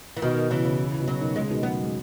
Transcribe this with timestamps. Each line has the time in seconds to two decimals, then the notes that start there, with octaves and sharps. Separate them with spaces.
0.17 E3
0.22 B2 D#3
0.50 C#3 E3
0.65 C#3
1.00 B2
1.07 C#3 F#3
1.21 B2 D#3
1.35 C#3 G#3
1.50 B2 D#3
1.63 D#3 F#3 B3
1.83 G#3